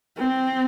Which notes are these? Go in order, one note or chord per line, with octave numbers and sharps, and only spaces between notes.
C4